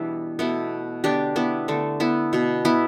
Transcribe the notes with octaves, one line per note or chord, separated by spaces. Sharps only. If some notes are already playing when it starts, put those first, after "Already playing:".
Already playing: B2 E3 G3 B3 D4 E4
B2 A3 B3 E4
D3 B3 D4 G4
B3 E4
D3 A3
B3 E4
B2 B3
B3 E4